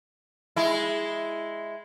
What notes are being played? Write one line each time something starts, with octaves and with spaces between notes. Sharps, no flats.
G#3 E4